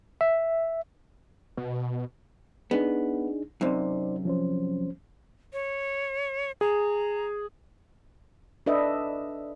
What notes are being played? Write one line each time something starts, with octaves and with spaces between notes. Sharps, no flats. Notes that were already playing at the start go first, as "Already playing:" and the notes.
E5
B2
B3 D4 D#4 G#4
F#2 C3 D#4 C5 D5
F3 C#4 C5
C#5
G#4 A#5
D4 A4 B4 D#5 E5